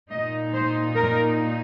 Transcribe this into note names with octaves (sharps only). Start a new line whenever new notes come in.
A#2 A#3 D#4 D#5
C5
A#4